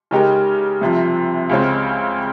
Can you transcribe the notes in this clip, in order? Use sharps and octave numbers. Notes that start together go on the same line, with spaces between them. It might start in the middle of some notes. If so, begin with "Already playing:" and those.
C#3 G#3 D#4 G4 A#4
C2 C3 F3
C#2 C#3 G#3 C4